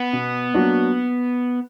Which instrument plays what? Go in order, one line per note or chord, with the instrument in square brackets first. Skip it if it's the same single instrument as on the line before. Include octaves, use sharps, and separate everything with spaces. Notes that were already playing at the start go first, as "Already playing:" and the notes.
Already playing: [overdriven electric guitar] B3
[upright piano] B2
F#3 A#3 D4 F#4